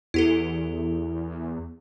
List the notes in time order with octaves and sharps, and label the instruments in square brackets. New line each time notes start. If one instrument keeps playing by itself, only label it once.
[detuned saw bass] E2 [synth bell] E4 G4 A4